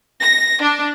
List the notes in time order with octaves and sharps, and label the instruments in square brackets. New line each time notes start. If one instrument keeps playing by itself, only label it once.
[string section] A#6
D4